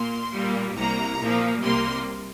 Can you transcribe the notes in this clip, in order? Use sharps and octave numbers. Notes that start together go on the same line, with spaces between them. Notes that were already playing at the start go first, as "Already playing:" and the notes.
Already playing: A#2 A#3 C6
A#2 G3 A#3
C2 C3 A#3 A#5
A#2 F3 A#3
C2 C3 G3 A#3 C6